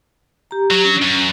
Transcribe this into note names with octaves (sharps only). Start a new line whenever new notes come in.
G4 A#5
F#3
C#4 D4
F#2 C#4